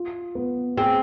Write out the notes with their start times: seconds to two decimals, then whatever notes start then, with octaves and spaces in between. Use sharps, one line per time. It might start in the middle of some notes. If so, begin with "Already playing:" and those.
Already playing: F4
0.35 B3
0.77 C4 G#4